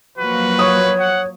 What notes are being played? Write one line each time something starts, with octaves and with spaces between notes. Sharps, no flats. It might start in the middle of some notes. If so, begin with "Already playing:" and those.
F3 F#3 A#3 F4 F#4 B4
C#5 C#6 D#6
F#5